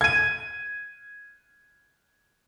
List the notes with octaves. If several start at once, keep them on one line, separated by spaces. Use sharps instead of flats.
G#6 D#7